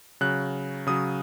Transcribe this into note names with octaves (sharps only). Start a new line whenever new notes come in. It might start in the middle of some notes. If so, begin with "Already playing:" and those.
C#3 F#3 F#6
C#3 F#3 D#6